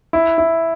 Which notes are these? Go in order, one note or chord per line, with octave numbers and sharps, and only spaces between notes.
E4
E4